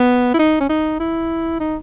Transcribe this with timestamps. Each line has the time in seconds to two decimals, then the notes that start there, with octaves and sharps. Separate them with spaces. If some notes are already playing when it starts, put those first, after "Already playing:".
Already playing: B3
0.34 E4
0.39 D#4
0.61 C#4
0.69 D#4
1.00 E4
1.60 D#4